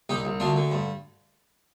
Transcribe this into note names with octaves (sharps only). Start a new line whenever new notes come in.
C2 D#4 G4
C2
D2 D4 F4
D3
G2